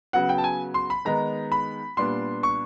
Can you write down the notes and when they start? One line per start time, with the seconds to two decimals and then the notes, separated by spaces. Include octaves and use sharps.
0.13 C#3 F#3 B3 F#5
0.29 G5
0.38 A5
0.44 G#5
0.74 C6
0.90 B5
1.05 D#3 G#3 B3 D#4 A#5
1.52 B5
1.97 A#2 G3 B3 D4 C6
2.43 C#6